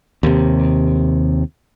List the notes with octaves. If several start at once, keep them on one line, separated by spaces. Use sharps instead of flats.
D#2 C3